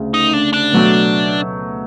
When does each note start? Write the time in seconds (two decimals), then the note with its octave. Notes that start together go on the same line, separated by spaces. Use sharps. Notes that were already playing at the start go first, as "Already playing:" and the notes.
Already playing: D2 C#3
0.14 D#4
0.33 D4
0.53 D4
0.72 B2 F#3 A3